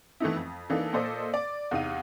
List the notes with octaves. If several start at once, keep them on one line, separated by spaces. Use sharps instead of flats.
E3 A3 B3 D#4 E4
F2
E3 A#3 D4 D#4 A4
A#2 A4 C5 D5 D#5 D#6
D5
E2 C3 D#4 F5 D#7